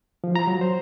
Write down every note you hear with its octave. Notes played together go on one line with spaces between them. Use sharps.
F3
A#5
F#3
C5